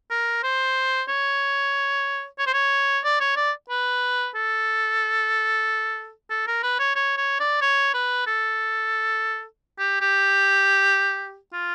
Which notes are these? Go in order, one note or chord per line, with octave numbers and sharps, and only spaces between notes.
A#4
C5
C#5
C#5
C5
C#5
D5
C#5
D5
B4
A4
A4
A#4
B4
C#5
C#5
C#5
D5
C#5
B4
A4
G4
G4
F4